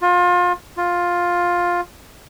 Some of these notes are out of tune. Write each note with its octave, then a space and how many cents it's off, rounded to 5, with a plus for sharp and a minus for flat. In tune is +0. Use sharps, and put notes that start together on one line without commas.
F4 +30
F4 +10